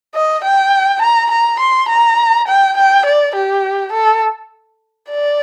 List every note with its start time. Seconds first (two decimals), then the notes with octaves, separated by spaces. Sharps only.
0.14 D#5
0.44 G5
1.02 A#5
1.31 A#5
1.60 C6
1.89 A#5
2.48 G5
2.77 G5
3.06 D5
3.35 G4
3.93 A4
5.10 D5